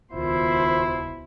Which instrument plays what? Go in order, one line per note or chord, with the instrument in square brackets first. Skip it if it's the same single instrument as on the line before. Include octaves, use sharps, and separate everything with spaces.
[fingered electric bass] D#1 C#2 [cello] B2 C5 [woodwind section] D#3 F4 [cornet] E4